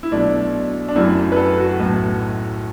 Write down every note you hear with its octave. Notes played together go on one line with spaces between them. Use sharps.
E4
B1 B2 A3 D4
D4
F#1 F#2 F#3 A3 E4
B4
A4
F#4
B1 A2 F#3 A3